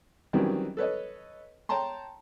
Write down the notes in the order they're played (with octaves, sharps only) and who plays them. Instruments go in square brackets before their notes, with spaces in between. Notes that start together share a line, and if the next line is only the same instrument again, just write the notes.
[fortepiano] D#3 E3 F#3 G3 C4 C#4
A4 B4 C#5 D#5
C#5 G5 A5 A#5 C6